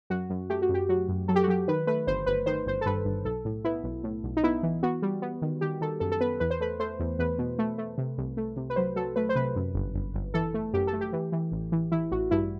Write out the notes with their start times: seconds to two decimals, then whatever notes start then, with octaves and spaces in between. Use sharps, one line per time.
0.10 F#2 F#4
0.30 F#2
0.50 A3 G4
0.62 F#4
0.69 F#2
0.74 G4
0.89 F#3 F#4
1.09 F#2
1.28 F#3 A4
1.36 G4
1.43 F#4
1.48 F#3 G4
1.68 D#3 B4
1.87 A3 B4
2.07 G1 C5
2.26 G1 B4
2.46 D#3 C5
2.66 G1 C5
2.81 A4
2.86 G2 B4
3.05 G1
3.25 B1 A4
3.45 A2
3.64 B3 E4
3.84 B1
4.04 A2
4.24 B1
4.37 D#4
4.43 B3 E4
4.63 E3
4.83 B3 F#4
5.02 G3
5.22 B3
5.42 D#3
5.61 D#3 G4
5.81 D#3 A4
6.00 F#2 A4
6.12 A4
6.20 B3 B4
6.40 E2 B4
6.50 C5
6.60 A3 B4
6.80 A3 C5
6.99 E2
7.19 E2 B4
7.38 B2
7.59 A3
7.78 A3
7.98 C3
8.18 C2
8.37 A3
8.56 C3
8.70 B4
8.76 F#3 C5
8.96 F#3 A4
9.16 A3 B4
9.29 C5
9.36 C3 B4
9.56 F#2
9.75 G1
9.95 G1
10.14 G1
10.34 E3 A4
10.54 A3
10.73 F#2 G4
10.87 A4
10.93 A3
11.01 G4
11.13 E3
11.32 E3
11.52 A1
11.72 E3
11.92 E3 E4
12.12 A1 F#4
12.31 G2 E4